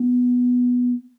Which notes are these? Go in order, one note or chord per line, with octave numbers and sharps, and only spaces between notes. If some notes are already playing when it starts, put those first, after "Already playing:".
Already playing: B3